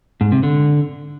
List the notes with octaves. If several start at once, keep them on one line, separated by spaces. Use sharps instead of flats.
G#2
C3
D3